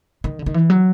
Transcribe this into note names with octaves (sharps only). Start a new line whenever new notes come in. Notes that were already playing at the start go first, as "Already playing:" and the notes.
D#3
D3
D#3
E3
F#3